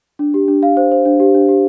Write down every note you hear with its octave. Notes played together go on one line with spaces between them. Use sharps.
D4
G4
D4
F5
C5
C5
D4
G4
D4
G4